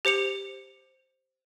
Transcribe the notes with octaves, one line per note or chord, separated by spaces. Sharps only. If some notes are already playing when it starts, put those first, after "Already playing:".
G4 C5 C#7 F7